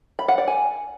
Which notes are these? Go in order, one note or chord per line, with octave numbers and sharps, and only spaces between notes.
B5
F#5
D5
G#5